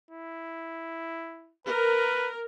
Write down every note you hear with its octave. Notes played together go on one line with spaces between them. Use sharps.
E4
A#4 B4